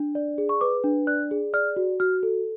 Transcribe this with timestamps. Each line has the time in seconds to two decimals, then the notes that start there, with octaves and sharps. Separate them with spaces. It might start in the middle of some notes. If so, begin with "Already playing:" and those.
Already playing: D4
0.15 D5
0.38 G#4
0.49 C#6
0.61 B4 D6
0.84 D4
1.07 D5 F#6
1.31 G#4
1.54 D5 F6
1.76 F#4
2.00 F#4 F6
2.23 A4